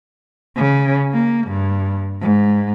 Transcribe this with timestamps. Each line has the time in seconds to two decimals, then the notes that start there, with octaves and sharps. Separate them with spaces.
0.56 C#3
1.13 A#3
1.47 G2
2.21 G#2